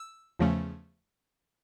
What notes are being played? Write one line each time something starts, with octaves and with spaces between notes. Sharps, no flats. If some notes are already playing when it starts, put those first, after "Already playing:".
Already playing: E6
E2 C#3 F3 A3 C#4